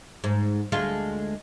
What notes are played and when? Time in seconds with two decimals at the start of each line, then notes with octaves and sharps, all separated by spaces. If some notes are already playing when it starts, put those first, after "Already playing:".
0.24 G#2
0.72 D2 G#3 F4